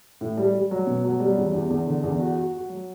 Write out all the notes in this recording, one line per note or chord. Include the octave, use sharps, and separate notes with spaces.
A2
G3
G3
F#3
B2
F#3
G3
E2
E2
E2
D3
E2
F#4
F#4
F#4
F#3